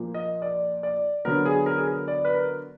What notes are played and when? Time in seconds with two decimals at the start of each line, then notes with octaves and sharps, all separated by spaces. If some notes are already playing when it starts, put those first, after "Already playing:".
Already playing: A#2 F3 A#3
0.14 D#5
0.42 D5
0.83 D5
1.25 D3 F#3 B3 A#4
1.45 G#4
1.66 A#4
1.77 G#4
1.87 A#4
2.08 D5
2.25 B4
2.35 A#4